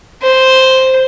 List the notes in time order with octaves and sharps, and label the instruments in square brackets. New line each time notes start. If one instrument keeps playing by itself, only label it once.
[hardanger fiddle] C5